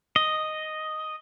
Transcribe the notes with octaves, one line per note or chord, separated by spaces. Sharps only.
D#5